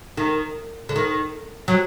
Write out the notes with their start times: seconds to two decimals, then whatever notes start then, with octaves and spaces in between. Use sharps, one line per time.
0.17 D#3
0.89 D3
0.96 D#3
1.68 F#3